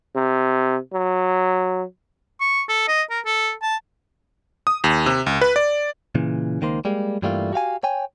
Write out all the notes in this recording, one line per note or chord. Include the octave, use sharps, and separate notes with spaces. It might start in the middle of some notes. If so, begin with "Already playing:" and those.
C3
F#3
C#6
A4
D#5
A#4
A4
A5
D#6
D#2
C3
C#2
B4
D5
A#2 C#3 E3
C#2 D#3 A#3 C5
G3 G#3 A#3
G2 E3 G3 A3 A#3 F4
F#4 G4 F5 G#5
C#5 G5 G#5